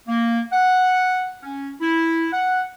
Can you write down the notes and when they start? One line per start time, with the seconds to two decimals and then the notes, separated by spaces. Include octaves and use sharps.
0.08 A#3
0.52 F#5
1.43 C#4
1.81 E4
2.33 F#5